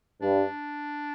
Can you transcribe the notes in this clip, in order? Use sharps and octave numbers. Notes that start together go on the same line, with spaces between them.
G2 D4